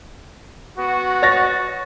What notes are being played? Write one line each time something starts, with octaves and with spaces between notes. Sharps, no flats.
B3 F#4
C#5 A6 A#6